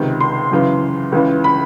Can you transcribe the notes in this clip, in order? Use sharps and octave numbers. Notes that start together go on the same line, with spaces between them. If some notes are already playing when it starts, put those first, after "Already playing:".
Already playing: C#2 C3 D#3
C6
F#2 C#3 E3
C#2 C#3 E3
B5